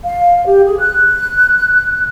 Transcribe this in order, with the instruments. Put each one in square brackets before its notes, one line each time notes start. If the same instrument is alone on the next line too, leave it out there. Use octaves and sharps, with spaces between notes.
[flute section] F5
G4
G#4
F#6